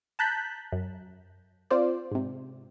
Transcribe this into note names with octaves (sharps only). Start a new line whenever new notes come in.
A5 A#5 F#6 G6 B6
F#2
C4 F4 C5 D5
G#2 C3